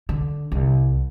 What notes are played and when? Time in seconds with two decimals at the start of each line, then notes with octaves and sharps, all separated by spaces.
0.09 D3
0.52 C2